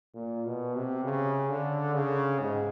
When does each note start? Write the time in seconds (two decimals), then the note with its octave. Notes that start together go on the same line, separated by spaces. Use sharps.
0.15 A#2
0.45 B2
0.75 C3
1.04 C#3
1.50 D3
1.94 C#3
2.39 G#2